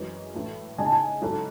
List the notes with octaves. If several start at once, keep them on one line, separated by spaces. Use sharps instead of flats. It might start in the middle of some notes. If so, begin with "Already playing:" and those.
Already playing: F#2 E3 G#3 C#4
A2 E3 A3 E4
C#3 G#3 D#4 G#5
A5
G#5
G#2 F#3 C#4 E4 A4